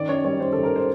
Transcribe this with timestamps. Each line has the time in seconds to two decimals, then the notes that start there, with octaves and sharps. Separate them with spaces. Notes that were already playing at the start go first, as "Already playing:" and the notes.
Already playing: D#3 C#4 D5
0.09 F#2 C#5
0.24 G3 C#5
0.40 F#2 C5
0.52 D#3 A4
0.63 A#4
0.76 C5